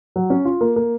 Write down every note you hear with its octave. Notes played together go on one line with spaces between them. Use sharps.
F#3
C#4
F4
A#3
A#3